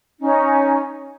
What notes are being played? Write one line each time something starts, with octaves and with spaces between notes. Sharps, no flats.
C#4 D#4